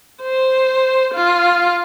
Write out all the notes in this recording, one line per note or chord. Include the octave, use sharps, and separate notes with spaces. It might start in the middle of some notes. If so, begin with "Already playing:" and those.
C5
F4